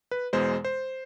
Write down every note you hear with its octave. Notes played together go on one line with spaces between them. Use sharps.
B4
E2 B2 G#3 C5
C5